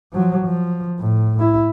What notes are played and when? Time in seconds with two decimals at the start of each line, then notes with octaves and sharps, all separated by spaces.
0.13 F3 F#3
0.45 F3
0.99 A2
1.39 E4